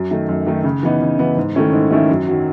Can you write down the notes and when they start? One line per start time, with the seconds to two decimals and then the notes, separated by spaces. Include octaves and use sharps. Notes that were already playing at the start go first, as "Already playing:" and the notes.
Already playing: F#2
0.11 D#3 A3 D#4
0.29 F#2
0.47 D#3 A3 D#4
0.64 C#3
0.83 E3 B3 D#4
1.01 C#3
1.19 E3 B3 D#4
1.37 G#2
1.55 D#3 A3 C#4 E4
1.73 G#2
1.91 D#3 A3 C#4 E4
2.09 F#2
2.27 D#3 F#3